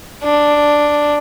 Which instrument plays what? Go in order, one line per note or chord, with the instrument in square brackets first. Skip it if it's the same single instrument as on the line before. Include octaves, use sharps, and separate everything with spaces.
[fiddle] D4